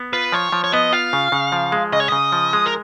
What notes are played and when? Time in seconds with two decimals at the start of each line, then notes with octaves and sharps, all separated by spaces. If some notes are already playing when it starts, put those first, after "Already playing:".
Already playing: B3
0.13 F4 B4
0.32 F3 C#5
0.52 F3
0.64 C#5
0.72 B3 D#5
0.93 F4 F5
1.13 C#3
1.32 C#3
1.52 F3
1.72 G#3
1.93 C#3 D#5
2.00 C#5
2.08 C#3 D#5
2.32 F3
2.53 G#3
2.66 A#4